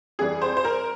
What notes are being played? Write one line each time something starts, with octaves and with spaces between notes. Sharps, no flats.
F2 E3 G3 G#4
C5
C5
A#4